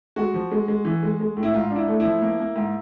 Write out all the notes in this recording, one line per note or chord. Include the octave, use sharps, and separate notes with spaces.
G#3 F#4
F3
G#3
G#3
E3
G#3
G#3
A2
E4
G#2 F4
D4
E4
A3
E4
F3
A#3
A#3
G#2